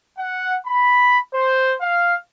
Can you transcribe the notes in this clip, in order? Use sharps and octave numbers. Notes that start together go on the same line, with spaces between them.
F#5
B5
C5
F5